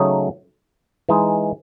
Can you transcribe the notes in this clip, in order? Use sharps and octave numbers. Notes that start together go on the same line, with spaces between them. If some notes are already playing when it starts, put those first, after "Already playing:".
Already playing: C#3 F#3 A3 D#4
E3 G#3 D#4